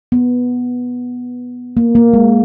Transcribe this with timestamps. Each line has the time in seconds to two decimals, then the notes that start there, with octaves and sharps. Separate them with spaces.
0.12 B3
1.77 A#3
1.95 A#3
2.14 G#3